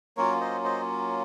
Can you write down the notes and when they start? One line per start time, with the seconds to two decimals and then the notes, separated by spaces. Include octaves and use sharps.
0.17 F#3 A#3 C#4 F4 A#4 C#5
0.40 C5 D#5
0.64 C5 D#5